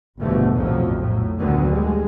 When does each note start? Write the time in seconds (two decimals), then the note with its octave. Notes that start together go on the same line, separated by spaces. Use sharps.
0.19 G1 E2 B2 D3 F3 A3
0.53 B1 F2 A2 F3 F#3
0.98 A2 F#3
1.39 D2 D3 D#3 F#3 B3
1.70 G3 G#3